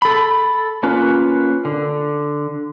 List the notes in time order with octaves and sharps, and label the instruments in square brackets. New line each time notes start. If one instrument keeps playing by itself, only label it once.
[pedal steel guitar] A4 B5
A#3 C#4 F4 B4
D3